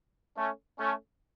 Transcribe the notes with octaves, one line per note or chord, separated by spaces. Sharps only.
A3 C#4
A3 C#4